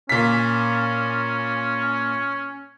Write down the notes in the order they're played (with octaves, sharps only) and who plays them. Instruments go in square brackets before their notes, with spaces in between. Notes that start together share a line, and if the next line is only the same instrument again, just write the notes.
[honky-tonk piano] A#2 B6 [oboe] C#4